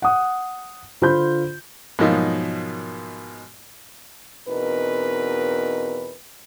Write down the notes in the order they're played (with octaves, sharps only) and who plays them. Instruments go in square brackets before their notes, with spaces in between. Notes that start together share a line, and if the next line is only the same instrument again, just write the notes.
[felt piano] F#5 D#6
D3 F4 C5 B5 C6 G6
[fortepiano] G#2 B2 F3 F#3 A#3 D#4
[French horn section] E2 B2 C4 D#4 A#4 B4